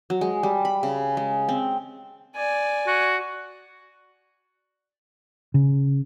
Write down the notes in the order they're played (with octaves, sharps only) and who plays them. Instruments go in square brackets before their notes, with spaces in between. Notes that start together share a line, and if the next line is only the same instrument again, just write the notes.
[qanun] F#3
G#3
G3
B5
C#3
G#3
C4
[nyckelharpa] D5 G#5
[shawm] F#4
[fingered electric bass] C#3